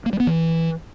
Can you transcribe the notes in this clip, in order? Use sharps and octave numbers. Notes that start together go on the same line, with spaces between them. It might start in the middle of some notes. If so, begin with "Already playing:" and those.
A#3
G3
B3
E3